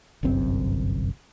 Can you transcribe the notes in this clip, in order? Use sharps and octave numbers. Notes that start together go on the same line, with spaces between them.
G1 C2 F#2 C4